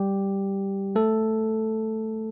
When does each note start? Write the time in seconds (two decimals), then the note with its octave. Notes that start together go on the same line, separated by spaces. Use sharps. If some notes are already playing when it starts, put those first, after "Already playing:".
Already playing: G3 G4
0.95 A3 A4